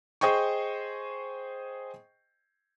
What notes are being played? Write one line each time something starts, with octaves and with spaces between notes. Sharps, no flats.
G#4 C5 D#5 G5 C#6